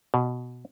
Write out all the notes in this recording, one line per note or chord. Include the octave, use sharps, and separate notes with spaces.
B2